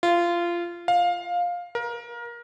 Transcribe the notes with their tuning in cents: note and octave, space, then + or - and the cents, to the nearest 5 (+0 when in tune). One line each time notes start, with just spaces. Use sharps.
F4 -20
F5 +15
A#4 +25